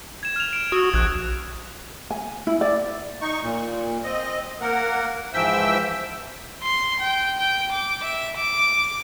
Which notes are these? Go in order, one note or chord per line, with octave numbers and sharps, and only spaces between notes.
G#6 E7
F6 F7
D7
F#4 D#6 E6
A#1 F#6 G#6
G#5
E4
D5
D#4 C#6
A#2
C4 D#5
A#3 A#4 F#5
G#2 E3 F3 E5 G5 E6
C6
G5
G5
D6
E5
D6